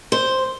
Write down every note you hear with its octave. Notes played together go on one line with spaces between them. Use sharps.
C5